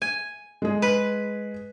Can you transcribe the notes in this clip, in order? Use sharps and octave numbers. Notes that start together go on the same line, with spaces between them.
G#5
G#3 G#4
B4